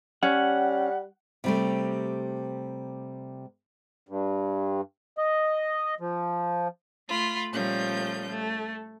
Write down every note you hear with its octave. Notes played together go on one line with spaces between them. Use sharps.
G3 C#4 F#5
C3 G3 A3
G2
D#5
F3
A3 F4 B5
A#2 F3 G3 A3 C#4 G6
A3